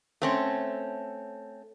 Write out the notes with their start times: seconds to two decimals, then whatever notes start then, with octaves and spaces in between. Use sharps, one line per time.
0.22 A3 C4 C#4